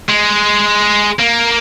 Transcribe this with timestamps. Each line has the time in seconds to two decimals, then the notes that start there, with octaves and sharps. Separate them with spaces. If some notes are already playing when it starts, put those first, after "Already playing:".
0.09 G#3
1.20 A#3